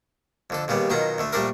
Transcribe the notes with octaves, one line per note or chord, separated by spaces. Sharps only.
F2 D3 A4
D#2 C#3 G3 B3
B2 D#3 F#3 F4 A#5
D2 D3 A3
A#1 G3 A3 D4 A4 A#4